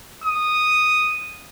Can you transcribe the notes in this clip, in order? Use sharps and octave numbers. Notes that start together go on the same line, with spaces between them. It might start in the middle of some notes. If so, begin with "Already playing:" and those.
D#6